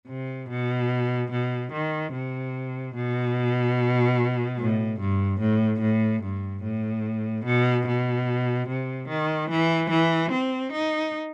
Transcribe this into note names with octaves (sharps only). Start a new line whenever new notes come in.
C3
B2
B2
D#3
C3
B2
A2
G2
A2
A2
G2
A2
B2
B2
C3
D#3
E3
E3
C4
D#4